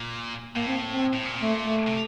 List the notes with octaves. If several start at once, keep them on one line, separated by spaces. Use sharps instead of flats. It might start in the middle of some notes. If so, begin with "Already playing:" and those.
Already playing: A#2
A2 A#3
C4
C4
A2
A#2
A3
A3
C3